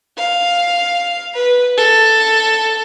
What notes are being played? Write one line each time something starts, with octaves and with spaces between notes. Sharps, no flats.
F5
B4
A4